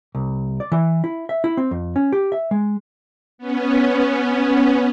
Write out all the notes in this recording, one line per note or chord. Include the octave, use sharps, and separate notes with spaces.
C2
D5
E3
E4
E5
E4
C4
F2
C#4
G4
E5
G#3
B3 C#4